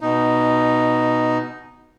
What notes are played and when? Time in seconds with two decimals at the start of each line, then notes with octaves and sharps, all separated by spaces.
0.01 B2 D#4